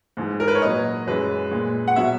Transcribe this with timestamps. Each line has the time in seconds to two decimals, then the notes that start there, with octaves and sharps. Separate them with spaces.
0.17 G#2 E3 G#3
0.40 A#4
0.48 B4
0.55 C#5
0.62 A#2 F#3 D#5
1.07 F#2 E3 G#3 B4
1.51 A#2 G#3
1.88 F#5
1.96 B2 F#3 E5